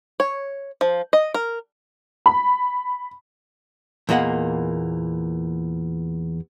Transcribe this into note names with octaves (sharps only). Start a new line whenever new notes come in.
C#5
F3
D#5
A#4
B5
E2 A#2 A#3 D#5 F#5